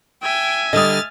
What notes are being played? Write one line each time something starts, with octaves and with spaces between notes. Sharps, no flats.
E5 G5 G#5
D3 G3 D#5 D#6 F6 A6